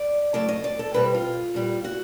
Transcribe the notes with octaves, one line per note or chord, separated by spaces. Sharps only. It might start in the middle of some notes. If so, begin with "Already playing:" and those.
Already playing: D5
C#3 F#3 A3 D5
D#5
D5
A4
B2 G3 C4 B4
F4
A#2 G3 B3
F#4